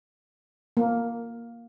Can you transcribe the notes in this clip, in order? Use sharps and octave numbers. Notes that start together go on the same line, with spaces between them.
A#3